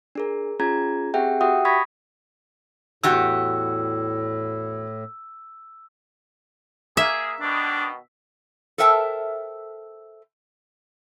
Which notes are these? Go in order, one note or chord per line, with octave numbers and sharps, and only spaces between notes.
D4 G#4 A#4
C#4 F4 G#4 A#5 G#6
C4 G4 G#4 E5 F#5 G5
F#4 G4 E5 F#5 G5 D#6
B5 C#6 D#6 G#6 A#6 B6
E2 A2 F#4 G4 E6
A#3 G#4 E5
B2 D#3 D4
A4 A#4 C5 E5 G5 A5